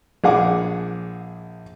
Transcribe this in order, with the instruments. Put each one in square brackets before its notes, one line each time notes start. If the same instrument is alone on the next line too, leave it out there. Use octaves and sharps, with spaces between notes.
[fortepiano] A#1 G#4 F#5 D6